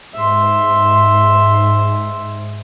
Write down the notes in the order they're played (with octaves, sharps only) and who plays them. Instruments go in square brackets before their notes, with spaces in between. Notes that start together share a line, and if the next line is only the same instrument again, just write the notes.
[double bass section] G#2 [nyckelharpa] E5 C6